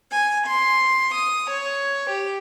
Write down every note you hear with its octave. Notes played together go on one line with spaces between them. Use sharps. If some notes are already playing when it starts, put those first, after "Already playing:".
G#5
C6
D#6
C#5
G4